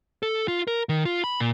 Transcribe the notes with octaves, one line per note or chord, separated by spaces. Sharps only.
A4
F4
A#4
D#3
F4
B5
A#2